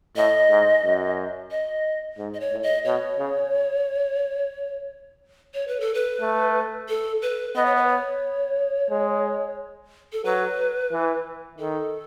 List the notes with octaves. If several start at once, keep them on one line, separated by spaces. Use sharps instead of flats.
A2 D#5
G#2
F#2
D#5
G#2
D#5
C#5
A2
D#5
B2 C#5
C#3
C#5
B4
A4
B4
A3
A4
B4
B3 D#5
C#5
B4
C#5
G#3
A4
F#3 B4
E3
D#3 A4